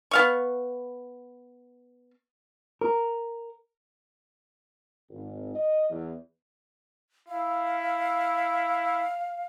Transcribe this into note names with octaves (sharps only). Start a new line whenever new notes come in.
B3 F5 C#6
A#4
G#1
D#5
E2
E4 F5